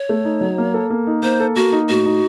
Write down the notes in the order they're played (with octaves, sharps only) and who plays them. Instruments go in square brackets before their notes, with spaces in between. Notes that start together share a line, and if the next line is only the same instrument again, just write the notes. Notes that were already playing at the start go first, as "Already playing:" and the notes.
Already playing: [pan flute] C#5
[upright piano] A3
D#4
F#3
A#3
A4
A#3
D#4
[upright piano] A#3 [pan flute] C5
[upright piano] A4
[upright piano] A#3 [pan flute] F#4
[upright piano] D#4
[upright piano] A2 [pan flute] F#4
[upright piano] D#4